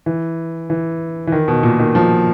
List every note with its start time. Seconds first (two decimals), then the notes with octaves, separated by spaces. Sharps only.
0.06 E3
0.70 E3
1.27 E3
1.32 D#3
1.48 B2
1.63 A#2
1.80 D#3
1.95 F3